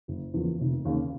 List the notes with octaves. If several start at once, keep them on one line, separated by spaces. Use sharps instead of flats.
F#1
E2 C#3 F3 A#3
F1
D#2 C#3